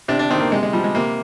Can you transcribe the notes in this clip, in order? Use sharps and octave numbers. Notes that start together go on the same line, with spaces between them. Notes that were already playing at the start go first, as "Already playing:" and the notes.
C3 D4
D4
D#3 C4
A#3
C3 G#3
G#3
F3 G3
G#3
C3 A#3